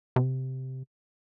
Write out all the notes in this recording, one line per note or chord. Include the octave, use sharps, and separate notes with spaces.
C3